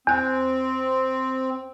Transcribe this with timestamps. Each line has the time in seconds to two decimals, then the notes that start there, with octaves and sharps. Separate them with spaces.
0.07 E2 C4 F#6